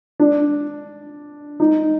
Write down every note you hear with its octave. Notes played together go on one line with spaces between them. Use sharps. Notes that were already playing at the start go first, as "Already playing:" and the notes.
D4
D#4